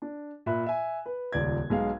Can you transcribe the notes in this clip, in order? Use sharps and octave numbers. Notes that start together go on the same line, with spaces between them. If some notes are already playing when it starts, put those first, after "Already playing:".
D4
A#2 E5 B5 F#6
E5 G#5
B4
D#1 C#2 D5 G#6
B1 G#3 F5